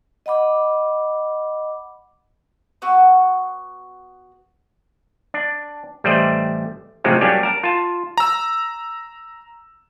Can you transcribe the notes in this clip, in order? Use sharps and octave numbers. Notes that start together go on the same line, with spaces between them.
D#5 F#5 B5 D6
B3 F#4 E6
D4
A1 G3 A3 C5 D5 D#5
A2 C3 F3 F#3 G#3 C4
F#3 G3 A#3 C#4 D4 G4
A#4 A5
F4 A5
A#5 E6